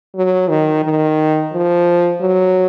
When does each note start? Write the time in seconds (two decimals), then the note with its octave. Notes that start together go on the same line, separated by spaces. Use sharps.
0.15 F#3
0.49 D#3
0.84 D#3
1.53 F3
2.21 F#3